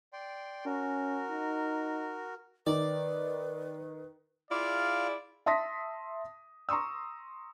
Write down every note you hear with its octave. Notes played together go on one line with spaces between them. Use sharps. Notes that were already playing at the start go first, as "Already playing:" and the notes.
D5 G5 C6
C#4 F#4 A#4
D#4
D#3 B4 D5
E4 F4 G#4 D5 F5
E5 A5 C6 D#6 A#6 B6
A#5 C6 C#6 D#6 E6